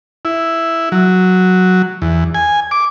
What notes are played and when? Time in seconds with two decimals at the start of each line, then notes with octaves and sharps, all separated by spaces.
0.25 E4
0.92 F#3
2.02 E2
2.34 G#5
2.71 D6